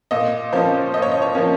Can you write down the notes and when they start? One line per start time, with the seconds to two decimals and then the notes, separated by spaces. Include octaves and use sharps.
0.11 A#2 D#5
0.53 F3 A#3 C#4 C5
0.94 A#2 D#5
1.02 C#5
1.12 D#5
1.22 C#5
1.35 F3 A#3 C#4